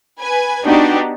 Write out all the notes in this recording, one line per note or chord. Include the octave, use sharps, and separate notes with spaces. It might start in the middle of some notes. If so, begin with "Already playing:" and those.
B4 G#5
B3 D4 D#4 F#4 G4